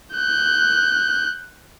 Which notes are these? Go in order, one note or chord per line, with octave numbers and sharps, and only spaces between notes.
F#6 G6